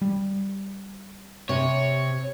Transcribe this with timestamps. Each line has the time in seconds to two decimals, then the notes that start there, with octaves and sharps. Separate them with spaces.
0.02 G3
1.49 C3 C#5